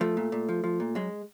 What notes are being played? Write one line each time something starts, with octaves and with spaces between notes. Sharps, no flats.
F3 A3
A#2
A#2
F3
F3
A#2
F#2 G#3